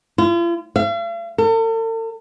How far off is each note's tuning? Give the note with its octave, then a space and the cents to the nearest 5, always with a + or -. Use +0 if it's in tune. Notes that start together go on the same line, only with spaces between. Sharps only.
F4 -45
F5 -45
A4 +45